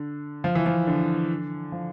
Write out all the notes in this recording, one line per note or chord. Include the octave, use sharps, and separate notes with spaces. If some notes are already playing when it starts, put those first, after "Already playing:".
Already playing: D3
F3
E3
F3
D3
F3